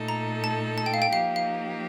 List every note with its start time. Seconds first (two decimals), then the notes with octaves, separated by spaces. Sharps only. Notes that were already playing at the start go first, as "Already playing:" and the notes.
Already playing: A#2 A3 D#4 A4
0.09 A#5
0.44 A5
0.78 A5
0.86 G5
0.94 F5
1.02 G5
1.12 F3 A#3 D#4 G4 F5
1.36 F5